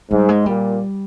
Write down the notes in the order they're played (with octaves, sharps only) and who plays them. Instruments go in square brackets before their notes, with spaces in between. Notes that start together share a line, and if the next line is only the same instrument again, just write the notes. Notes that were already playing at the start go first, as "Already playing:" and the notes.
[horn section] G#2 [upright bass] G3
[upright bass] G#3
[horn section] A#2 [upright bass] G3